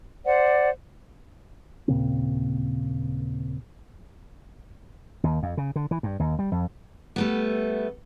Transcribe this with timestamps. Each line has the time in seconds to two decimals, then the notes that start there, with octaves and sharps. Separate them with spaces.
0.24 C5 D5 F#5
1.88 D#2 A#2 C#3 C4
5.24 D#2
5.43 F2
5.57 C#3
5.76 D3
5.91 E3
6.03 G2
6.20 D#2
6.39 G3
6.52 F2
7.16 G3 A3 B3